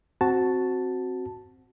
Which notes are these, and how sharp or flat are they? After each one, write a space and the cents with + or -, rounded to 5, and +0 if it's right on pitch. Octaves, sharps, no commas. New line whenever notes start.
C4 +0 F#4 +0 A5 +0